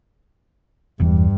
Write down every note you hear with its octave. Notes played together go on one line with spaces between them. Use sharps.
E1 E2 G2 E3